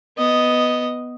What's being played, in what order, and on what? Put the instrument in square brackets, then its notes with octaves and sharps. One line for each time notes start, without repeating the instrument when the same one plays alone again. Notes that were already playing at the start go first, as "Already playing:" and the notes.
[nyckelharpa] B3 D#5